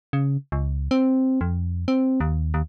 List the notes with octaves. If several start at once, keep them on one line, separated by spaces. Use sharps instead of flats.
C#3
C#2
C4
F2
C4
D#2
D#2